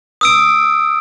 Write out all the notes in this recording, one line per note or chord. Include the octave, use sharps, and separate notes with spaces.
D#6 E6 D7